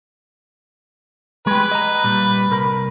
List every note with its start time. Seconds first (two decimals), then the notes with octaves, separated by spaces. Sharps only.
1.47 G#3 G4 B4
1.71 D#5 A#5
2.04 A#2 G3
2.50 C2 A#4 B5